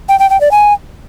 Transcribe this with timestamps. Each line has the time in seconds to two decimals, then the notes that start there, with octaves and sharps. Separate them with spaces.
0.09 G5
0.19 G5
0.30 G5
0.41 D5
0.51 G#5